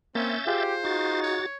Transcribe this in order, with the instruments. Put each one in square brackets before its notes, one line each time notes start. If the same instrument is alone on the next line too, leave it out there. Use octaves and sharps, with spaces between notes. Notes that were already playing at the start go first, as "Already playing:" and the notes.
[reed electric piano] A#3 [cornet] C4 [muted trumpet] C#4 [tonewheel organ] E5 G6 A6
[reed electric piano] F4 G#4 F5 [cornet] G4 [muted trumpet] C5
[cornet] D#4 [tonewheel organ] F#4 A6
[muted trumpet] C#5